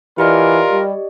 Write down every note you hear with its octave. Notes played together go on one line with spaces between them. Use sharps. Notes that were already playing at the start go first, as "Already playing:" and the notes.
E3 F4 G4 A#4 D5 D#5
G3